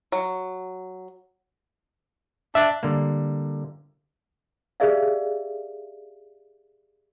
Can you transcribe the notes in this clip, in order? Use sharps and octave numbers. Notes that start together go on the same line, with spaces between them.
F#3
D4 E5
D3 G3 A#3
G4 G#4 A#4 D5 E5 F5